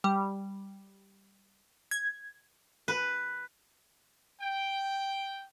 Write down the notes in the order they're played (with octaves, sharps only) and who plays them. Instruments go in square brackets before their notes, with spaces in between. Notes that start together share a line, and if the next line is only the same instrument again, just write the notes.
[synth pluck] G3
G#6
[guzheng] B4
[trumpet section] G5